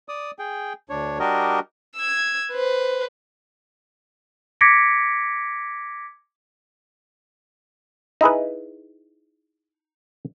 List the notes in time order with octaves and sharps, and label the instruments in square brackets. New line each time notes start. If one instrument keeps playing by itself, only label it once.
[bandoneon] D5 D#6
G#4 G5
D2 D4 C#5
G3 D4 F#4 G4 A#4 D#5
[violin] E6 G#6
B4 C5
[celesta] D6 G#6 A#6 B6 C#7 D7
[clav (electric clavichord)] D#4 E4 G#4 B4